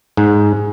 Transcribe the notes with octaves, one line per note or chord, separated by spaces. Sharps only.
G#2